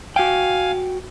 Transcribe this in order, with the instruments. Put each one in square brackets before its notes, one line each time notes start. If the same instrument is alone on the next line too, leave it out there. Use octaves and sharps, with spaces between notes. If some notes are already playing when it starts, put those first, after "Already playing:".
[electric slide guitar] F#4 G5 [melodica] F5 G#5